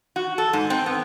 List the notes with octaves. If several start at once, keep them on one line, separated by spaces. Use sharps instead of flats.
F#4
A4
G#2
C4
B3